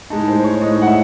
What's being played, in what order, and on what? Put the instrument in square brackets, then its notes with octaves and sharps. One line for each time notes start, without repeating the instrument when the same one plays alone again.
[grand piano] A2 G#3 D#4 A5
C5
C#5
A2 G#3 D#4 D#5
F#5
E5